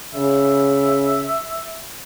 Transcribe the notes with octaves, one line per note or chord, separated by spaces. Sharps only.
C#3 E5